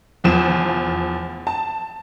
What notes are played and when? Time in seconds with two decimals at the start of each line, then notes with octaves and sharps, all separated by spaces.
0.24 F1 E2 F3 E7
1.47 A5